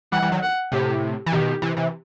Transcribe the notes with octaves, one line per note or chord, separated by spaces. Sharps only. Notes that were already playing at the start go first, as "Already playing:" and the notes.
E3 G3 F#5
E3 G3
D#3 F#3
F#5
A2 C3 G4
E3
B2 D#3 G4
C3 E3
C3 E3